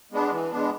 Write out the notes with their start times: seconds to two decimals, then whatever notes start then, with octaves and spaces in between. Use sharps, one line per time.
0.12 G#3 B3 D4
0.31 E3
0.50 G#3 B3 D4